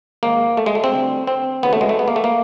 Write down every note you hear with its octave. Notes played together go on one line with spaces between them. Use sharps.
G#2 D#3 G#3 A#3
A3
G#3
A3
C4
D2 D3 G3
C4
D#2 C#3 F#3 B3
A3
G#3
A3
B3
A#3
A3
A#3